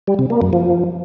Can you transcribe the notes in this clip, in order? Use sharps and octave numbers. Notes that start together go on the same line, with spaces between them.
G3
C3
A#3
F#2
F3